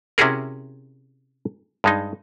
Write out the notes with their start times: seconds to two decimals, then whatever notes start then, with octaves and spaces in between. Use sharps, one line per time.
0.18 C3 C#4 E4 F#4 G#4 A#4
1.84 G2 G#3 D#4